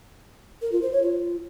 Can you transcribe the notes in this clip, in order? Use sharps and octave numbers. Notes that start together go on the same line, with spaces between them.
A#4
F4
C5
C#5
F4